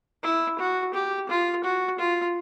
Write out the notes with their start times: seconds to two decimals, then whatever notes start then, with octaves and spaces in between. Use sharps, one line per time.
0.23 E4
0.59 F#4
0.94 G4
1.29 F4
1.64 F#4
1.99 F4